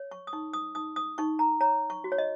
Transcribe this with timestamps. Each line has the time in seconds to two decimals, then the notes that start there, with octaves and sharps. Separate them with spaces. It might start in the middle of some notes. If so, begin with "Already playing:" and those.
Already playing: C#5
0.11 C#6
0.27 D#6
0.33 D#4 C#6
0.53 D#6
0.75 D#4 D#6
0.96 D#6
1.18 D#4 C#6
1.39 A#5
1.61 C#5 A#5
1.90 C#6
2.04 F#4
2.12 C#5
2.18 D#5